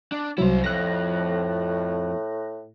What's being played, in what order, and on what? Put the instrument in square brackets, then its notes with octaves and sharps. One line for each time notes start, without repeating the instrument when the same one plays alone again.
[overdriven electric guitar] D4
[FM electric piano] C2 F#3 [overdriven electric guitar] E4 C5
[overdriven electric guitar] F2 [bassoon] A2 [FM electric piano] F#6 A#6